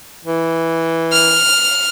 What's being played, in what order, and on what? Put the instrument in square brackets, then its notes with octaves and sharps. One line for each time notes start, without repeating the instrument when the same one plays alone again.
[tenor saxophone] E3
[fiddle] F6